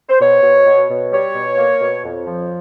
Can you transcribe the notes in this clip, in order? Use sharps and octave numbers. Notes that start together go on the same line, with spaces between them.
C5
B2 C#5
B2
B2
B2
G3 C#5
B2
A#3
B2
F2
F3